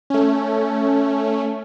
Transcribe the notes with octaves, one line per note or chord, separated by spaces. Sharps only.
A3 C#4